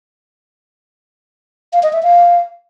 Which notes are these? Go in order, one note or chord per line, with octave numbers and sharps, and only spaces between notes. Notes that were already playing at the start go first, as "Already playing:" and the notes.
F5
D#5
E5
F5